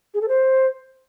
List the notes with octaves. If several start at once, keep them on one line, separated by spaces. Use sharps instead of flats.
G#4
A4
C5